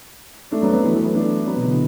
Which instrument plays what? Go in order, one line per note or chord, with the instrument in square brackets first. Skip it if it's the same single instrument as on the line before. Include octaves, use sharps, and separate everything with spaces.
[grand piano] A3 D4
F#3 B3
F#3 B3
E3 A3
E3 A3
F#3 B3
A3 D4
F#3 B3
B2
D3
E3